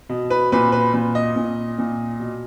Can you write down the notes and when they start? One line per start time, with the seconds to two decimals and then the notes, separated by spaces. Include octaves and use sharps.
0.09 B2
0.30 B4
0.52 A#2 B4
0.72 B4
0.94 A#2
1.15 D#5
1.36 A#2
1.79 A#2
2.19 B2